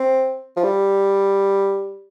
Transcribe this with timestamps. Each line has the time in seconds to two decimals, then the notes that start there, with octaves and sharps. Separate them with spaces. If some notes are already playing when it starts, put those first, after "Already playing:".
Already playing: C4
0.57 F3
0.64 G3